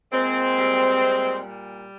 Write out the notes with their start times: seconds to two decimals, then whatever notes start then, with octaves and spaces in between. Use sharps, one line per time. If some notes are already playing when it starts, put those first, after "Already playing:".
0.12 A#2 G#3 C4
0.56 G3
1.01 A#2
1.46 G3